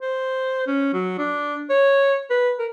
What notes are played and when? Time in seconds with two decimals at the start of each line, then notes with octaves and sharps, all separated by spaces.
0.02 C5
0.67 C#4
0.94 F#3
1.19 D4
1.70 C#5
2.30 B4
2.59 A#4